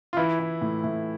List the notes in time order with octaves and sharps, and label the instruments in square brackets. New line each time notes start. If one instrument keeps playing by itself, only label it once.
[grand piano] F4
E3 E4
E3
A2
A2